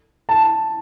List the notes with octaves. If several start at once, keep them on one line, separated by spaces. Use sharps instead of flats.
A5